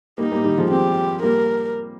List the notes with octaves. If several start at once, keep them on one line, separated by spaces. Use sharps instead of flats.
G3 A#3 D#4
G3 A#3
D#3 G3
F3 G#3
G#3 C4 G4
G3 A#3 A#4